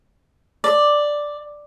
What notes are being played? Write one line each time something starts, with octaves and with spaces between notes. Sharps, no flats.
D5